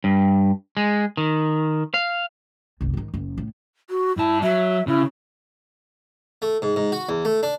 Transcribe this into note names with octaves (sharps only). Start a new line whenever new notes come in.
G2
G#3
D#3
F5
F#1 C2
G#2 D#3
F#1
A2
F#4
G2 E4 A5
F#3 E5
C#3 E4
A3
G#2
G#2
F#4
E2
A3
D4